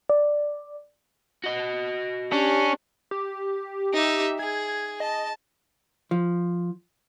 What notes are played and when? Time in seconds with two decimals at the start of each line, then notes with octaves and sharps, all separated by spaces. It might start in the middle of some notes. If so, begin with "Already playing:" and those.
0.10 D5
1.44 F#4 D#5
2.32 C#4 D4 G4
3.11 G4
3.93 D#4 E5
4.39 G#4 G#6
5.00 D#5 A5
6.11 F3